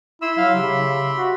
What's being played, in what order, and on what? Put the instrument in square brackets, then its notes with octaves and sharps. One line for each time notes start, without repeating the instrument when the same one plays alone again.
[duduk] E4 [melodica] E5 B5 C6 [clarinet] E6
[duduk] F#3 [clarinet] F5
[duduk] C#3 [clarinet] G4
[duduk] F#4